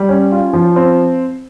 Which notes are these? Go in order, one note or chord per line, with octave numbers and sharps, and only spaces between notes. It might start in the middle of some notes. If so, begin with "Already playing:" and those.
Already playing: G3
C#4
F4
F3
C4